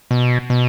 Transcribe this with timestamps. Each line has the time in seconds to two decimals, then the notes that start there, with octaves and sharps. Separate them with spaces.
0.11 B2
0.50 B2